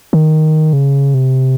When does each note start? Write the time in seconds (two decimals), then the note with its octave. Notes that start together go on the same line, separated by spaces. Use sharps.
0.13 D#3
0.73 C#3
1.14 C3